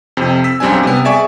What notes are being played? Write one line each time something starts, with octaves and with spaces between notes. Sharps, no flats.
F2 C3
E6 B6
B1 F#2 G3 C4 D4 G#5
C3 G3 B3
G#4 D5 E5 G#5 C#6